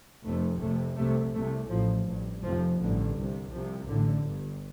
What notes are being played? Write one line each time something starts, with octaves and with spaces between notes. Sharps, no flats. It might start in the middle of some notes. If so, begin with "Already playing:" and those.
F1 F2 C3 A3
F1 F2 C3 A3
C2 C3 A3
C2 C3 A3
A1 A2 F3
A1 G2
F1 F2 C3 F3
A1 G2 D3
C2 C3
C2 C3 F3
A1 A2 D3
G1 G2